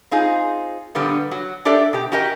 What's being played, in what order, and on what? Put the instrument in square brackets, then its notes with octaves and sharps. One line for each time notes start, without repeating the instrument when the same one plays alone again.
[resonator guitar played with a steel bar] C4 D#4 F4 G#4
A#2 D3 G3 B3
F#3 F#4
D4 G4 A4 D5 E5
B2 G4
C#4 F#4 G4 A#4 D#5 G5